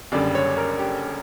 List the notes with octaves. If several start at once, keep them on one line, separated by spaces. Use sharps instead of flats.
F#1 F#2 D3 G3 D5
C#5
A#4
G4